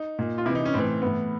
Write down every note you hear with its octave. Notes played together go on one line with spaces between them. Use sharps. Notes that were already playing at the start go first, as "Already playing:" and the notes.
Already playing: D#4
A#2
F4
C3 E3 E4
D#4
C#4
A2 E3 C4
A2 E3 B3